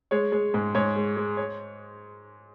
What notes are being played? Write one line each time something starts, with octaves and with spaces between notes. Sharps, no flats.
G#3 C#5
G#3
G#2
G#2 C#5
G#3
G#3
C#5